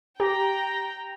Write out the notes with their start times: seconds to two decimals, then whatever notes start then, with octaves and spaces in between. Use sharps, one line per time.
0.20 G4 G5 A#5